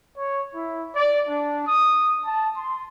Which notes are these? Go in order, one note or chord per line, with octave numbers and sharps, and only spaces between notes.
C#5
E4
D5
D4
D#6
A5
C6